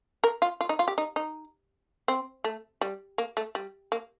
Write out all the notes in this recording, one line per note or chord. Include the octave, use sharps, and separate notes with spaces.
A#4
F4
F4
D#4
F4
G4
D#4
D#4
C4
A3
G3
A#3
A3
G3
A#3